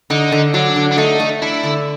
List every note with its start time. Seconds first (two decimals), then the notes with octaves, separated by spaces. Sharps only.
0.10 D3 D#4
0.32 D3
0.54 F#3 D4
0.76 D3
0.92 D4
0.97 A3 D#4
1.20 A3
1.42 D4 E4
1.64 D3